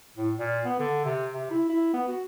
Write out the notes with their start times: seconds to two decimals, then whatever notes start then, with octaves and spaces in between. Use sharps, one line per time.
0.17 A2
0.38 A#2
0.65 B3
0.79 D3
1.05 C3
1.33 C3
1.51 E4
1.69 E4
1.93 B3
2.08 F#4